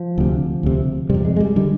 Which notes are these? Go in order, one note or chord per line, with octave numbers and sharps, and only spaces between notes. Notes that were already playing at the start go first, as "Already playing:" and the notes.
Already playing: F3
D2 C3
D2 C3
F2 C3 G3
G#3
G#3
G3
D3 G3